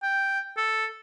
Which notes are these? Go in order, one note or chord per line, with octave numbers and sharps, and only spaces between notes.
G5
A4